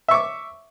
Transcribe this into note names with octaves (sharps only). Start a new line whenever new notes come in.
E5 C#6 D6